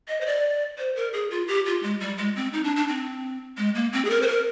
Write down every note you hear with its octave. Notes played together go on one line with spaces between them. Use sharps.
D#5
C5
D5
C5
A#4
G#4
F4
G4
F4
G#3
G3
G#3
C4
D#4
D4
D4
C4
G#3
A#3
C4
G#4
A#4
C5
A#4